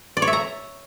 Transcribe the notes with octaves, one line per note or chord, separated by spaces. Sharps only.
D5
C#5
E5
A#5